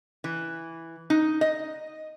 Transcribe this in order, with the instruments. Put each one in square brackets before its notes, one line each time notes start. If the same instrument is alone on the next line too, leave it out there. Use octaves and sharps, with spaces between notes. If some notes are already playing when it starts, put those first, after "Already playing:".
[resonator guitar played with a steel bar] E3
D#4
D#5